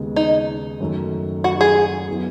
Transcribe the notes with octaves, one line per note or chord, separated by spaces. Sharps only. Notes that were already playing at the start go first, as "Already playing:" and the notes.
Already playing: D#2 C#3 G#3 B3
D#4
F#2 D#3 F#3 A3
F#4
G#4
F#3 B3 E4